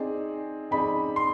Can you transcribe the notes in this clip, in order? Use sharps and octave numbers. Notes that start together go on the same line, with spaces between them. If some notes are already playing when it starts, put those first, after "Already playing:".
Already playing: C4 D#4 G#4 D5
C4 D#4 G#4 D5 B5
C6